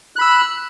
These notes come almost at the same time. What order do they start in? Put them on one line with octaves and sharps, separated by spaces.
F#6 B5 E6